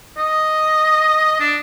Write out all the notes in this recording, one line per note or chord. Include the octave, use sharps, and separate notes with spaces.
D#5
D4